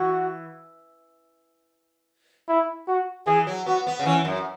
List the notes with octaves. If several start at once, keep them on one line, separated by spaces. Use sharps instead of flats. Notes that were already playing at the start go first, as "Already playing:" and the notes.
Already playing: E3 F#4
E4
F#4
E3 G#4
F#3
B3 F#4
B3
C#3
E3 C#4
F#2